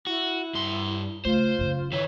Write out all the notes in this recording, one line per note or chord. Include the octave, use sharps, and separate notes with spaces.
E4 F#4
G2 C6
C#3 A3 F4 C5
F#2 C#3
D#3 E4 C#5